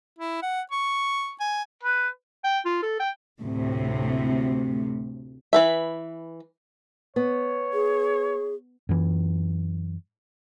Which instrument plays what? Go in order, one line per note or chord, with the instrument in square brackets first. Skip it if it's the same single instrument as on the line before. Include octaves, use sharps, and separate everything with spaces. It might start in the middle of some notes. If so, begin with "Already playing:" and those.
[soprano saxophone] E4
F#5
C#6
G#5
[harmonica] B4
[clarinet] G5
F4
A4
G5
[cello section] D2 A2 C3
[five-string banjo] E3 B4 E5
[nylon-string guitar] B3 [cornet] C#5
[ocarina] G#4
[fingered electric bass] F#2 E3